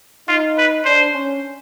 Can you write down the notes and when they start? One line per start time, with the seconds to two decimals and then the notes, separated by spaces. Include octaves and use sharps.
0.28 D#4 F4
0.58 B4
0.85 D4 C5
1.13 C#4